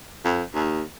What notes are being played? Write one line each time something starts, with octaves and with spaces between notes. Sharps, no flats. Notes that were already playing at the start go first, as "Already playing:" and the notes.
F2
D#2